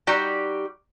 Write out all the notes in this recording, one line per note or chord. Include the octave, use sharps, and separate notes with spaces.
G3 D#4 F#4 G4